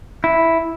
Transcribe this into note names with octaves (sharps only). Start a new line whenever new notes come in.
E4